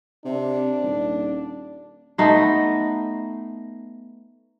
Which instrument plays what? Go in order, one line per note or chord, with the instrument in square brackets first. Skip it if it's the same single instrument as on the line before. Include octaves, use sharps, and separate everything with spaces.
[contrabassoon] C3 [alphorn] D4
[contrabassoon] D#1
[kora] A3 B3 D#4 C5